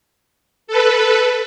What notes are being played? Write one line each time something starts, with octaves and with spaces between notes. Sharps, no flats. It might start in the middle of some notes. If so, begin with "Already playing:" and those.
A4 B4